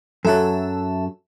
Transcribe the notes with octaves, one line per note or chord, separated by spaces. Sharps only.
F#2 F#3 A4 E5 A5